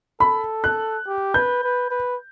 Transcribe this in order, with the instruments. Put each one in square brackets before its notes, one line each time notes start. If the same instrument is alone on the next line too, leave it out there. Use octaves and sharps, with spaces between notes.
[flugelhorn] A4 [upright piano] B5
[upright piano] F#6
[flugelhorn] G4
[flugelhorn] B4 [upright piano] G6
[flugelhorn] B4
B4